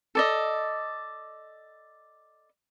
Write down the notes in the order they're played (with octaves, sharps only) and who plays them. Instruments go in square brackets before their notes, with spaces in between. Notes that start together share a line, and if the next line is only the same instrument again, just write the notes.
[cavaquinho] A4 D5 D#5